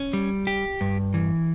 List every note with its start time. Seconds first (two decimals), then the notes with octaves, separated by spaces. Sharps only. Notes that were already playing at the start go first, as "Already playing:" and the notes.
Already playing: C#4
0.13 G3
0.47 G4
0.81 G2
1.14 E3